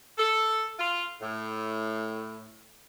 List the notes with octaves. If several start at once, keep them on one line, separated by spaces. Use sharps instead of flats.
A4
F4
A2